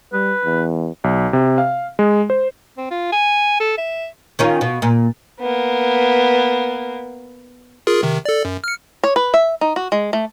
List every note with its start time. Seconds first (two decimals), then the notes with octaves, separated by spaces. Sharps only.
0.13 G3 B4
0.45 E2
1.04 B1
1.33 C3
1.58 F5
1.99 G#3
2.30 C5
2.78 C4
2.91 F4
3.13 G#5
3.60 A4
3.78 E5
4.39 D#3 C#4 F4
4.61 B2
4.82 A#2
5.40 A#3 B3
7.87 F4 G#4 A#4
8.03 C3 D#3
8.25 A4 D5
8.45 F#2
8.64 F6 C#7
9.04 C#5
9.16 B4
9.34 E5
9.61 D#4
9.76 F#4
9.92 G#3
10.13 A3